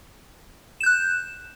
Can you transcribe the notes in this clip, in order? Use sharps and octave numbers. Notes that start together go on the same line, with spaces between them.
F#6 G6 E7